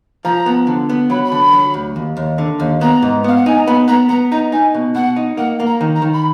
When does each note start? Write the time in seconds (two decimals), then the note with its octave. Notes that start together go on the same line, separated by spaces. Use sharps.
0.24 F3 A#5
0.46 B3
0.67 D3
0.89 B3
1.10 F#3 B5
1.24 B5
1.32 D3
1.53 F#3
1.74 D2
1.96 D#2
2.17 D#2
2.38 D3
2.60 D#2
2.81 B3 A#5
3.02 G#2
3.24 B3 F5
3.36 F#5
3.46 D#4 G#5
3.57 A#5
3.66 B3 B5
3.88 B3 A#5
4.09 B3 A#5
4.31 D#4 A#5
4.52 D#4 G#5
4.74 B2
4.95 B2 F#5
5.16 D#4
5.37 A#3 F#5
5.60 A#3
5.66 A#5
5.81 D#3
5.95 A#5
6.02 D#3
6.13 B5